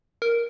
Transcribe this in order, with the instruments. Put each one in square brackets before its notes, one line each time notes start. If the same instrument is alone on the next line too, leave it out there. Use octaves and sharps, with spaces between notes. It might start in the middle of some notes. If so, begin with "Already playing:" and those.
[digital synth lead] A#4